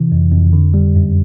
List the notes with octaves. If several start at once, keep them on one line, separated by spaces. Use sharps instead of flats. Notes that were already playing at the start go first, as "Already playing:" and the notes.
Already playing: C3 E3
F2
F2
D3
G3
F#2